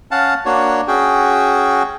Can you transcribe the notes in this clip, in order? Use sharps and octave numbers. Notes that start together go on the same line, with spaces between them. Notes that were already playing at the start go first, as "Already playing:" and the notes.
C#4 F5 F#5 A5
A#3 D4 F#4 C#5
C#4 F#4 G#4 G5